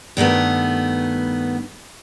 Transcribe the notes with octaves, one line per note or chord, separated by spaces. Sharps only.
G2 D#3 A3 B3